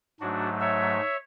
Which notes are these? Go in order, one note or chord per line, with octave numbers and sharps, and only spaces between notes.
G#2 F#3 A3 D4 F#4
C#5 E5